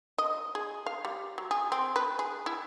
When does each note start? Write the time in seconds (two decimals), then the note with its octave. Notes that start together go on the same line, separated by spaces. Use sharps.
0.18 D#5
0.55 G#4
0.86 F5
1.05 G3
1.38 F#3
1.51 G#4
1.72 C4
1.96 B4
2.19 G#4
2.46 E4